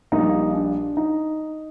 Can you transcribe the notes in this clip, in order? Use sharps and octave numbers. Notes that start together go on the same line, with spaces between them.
A#1 A#2 G3 A#3 D#4
D4
D#4